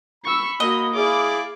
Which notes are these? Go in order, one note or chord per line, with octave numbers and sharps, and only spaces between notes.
B5 C#6 E6
A#3 F#4 D#5
E4 G#4 D5 F5 D6